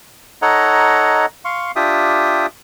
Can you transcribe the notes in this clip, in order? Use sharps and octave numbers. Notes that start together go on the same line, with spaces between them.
D#4 A4 C#5 D#5 F#5 A#5
F5 C6 C#6
D4 F4 G4 E5 G5 D#6